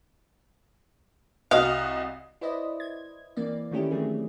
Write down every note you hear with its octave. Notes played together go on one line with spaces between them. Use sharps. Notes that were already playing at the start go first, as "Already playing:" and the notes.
C2 F#4 D#5 F5
E4 B4 C5 D5 D#5
G#6
E3 A#3 C4 D5
D#3 A3 A#3 C#4 E4 G4
E3 F#3 A3 C4 G#4